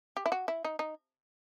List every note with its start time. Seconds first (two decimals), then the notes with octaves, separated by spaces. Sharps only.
0.17 G4
0.26 E4
0.32 F#4
0.48 E4
0.65 D#4
0.79 D#4